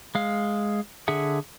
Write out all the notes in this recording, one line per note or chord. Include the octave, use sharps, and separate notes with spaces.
G#3 F5
D3 G#4 E5 F#5